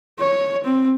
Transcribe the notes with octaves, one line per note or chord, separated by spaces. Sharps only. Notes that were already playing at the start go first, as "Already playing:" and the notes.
C#5
C4